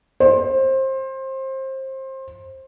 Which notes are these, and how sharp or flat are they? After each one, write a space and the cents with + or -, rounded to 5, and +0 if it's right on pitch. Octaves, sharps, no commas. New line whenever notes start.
C5 +25